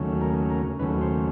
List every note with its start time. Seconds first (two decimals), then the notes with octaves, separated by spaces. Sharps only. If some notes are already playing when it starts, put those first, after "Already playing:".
Already playing: D#2 C#3 F#3 A3 C#4
0.21 A#4
0.50 A#4
0.79 D#2 C#3 F#3 A3 C#4 B4
1.01 C5